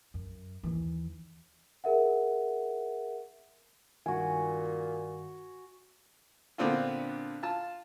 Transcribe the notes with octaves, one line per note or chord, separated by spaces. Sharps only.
F#2
D#2 E3
G#4 A#4 E5 F#5
G2 A#2 D#3 F#4 G#5
A#2 D3 B3 C4 D4 F4
F4 A5